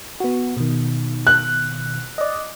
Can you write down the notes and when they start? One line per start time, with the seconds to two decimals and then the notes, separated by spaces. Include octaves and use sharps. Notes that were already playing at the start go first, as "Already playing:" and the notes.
0.20 B3 F#4
0.57 B2 D#3
1.27 F#6
2.18 D5 D#5